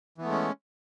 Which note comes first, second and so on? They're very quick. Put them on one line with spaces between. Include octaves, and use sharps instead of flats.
E3 B3 A3 G#3 C#4